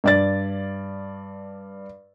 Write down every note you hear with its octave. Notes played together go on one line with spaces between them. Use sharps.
G2 D5 A6